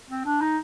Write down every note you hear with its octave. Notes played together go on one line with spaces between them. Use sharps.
C4
D4
D#4